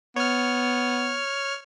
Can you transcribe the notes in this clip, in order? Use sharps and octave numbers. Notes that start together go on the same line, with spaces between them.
B3 C#5 F6